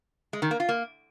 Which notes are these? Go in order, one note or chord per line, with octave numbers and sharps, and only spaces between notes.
G#3
D#3
A#3
F4
A#3